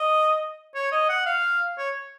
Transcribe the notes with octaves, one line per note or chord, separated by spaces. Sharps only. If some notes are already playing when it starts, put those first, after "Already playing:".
Already playing: D#5
C#5
D#5
F#5
F5
C#5